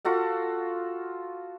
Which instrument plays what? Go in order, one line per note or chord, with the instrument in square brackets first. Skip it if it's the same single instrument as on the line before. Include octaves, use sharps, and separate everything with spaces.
[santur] F4 F#4 A4 F#5